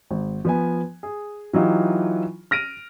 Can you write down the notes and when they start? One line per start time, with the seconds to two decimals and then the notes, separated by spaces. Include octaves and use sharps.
0.11 G#1
0.45 F3 B3 G#5
1.03 G#4
1.53 E3 F#3 D#4 F4 G4
2.51 F6 A#6 D7 D#7